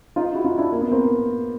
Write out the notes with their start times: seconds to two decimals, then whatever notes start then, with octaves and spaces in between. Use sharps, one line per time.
0.16 D#4 F4
0.35 E4 F#4
0.44 D#4 F4
0.58 D4 E4
0.72 A#3
0.82 B3
0.91 A#3 C4